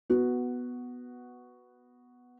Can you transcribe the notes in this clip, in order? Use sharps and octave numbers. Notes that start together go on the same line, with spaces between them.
B3 F#4